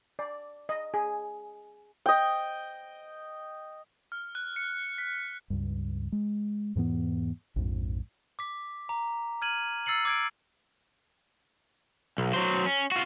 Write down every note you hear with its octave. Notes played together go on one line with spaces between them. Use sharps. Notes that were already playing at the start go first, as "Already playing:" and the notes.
D5
D#5
G#4
D#5 G5
F6
F#6
C#7
B6
C#2 G2
G#3
E2 G#2 E3 B3
A#1 F2 G#2
D6 B6
A#5
F6 G#6 D#7 F#7
E6 A6 C7 C#7 F#7
D6 G#6 D7
B1
F#3 C5
C#4
F4 F#4